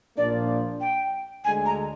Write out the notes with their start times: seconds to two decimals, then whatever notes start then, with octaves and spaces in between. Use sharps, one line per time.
0.17 A#1 A#2 F3 A#3 D4 D5
0.81 G5
1.45 D2 D3 G#3 G#5
1.66 A#5